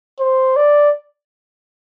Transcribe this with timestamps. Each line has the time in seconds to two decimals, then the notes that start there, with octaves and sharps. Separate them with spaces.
0.20 C5
0.57 D5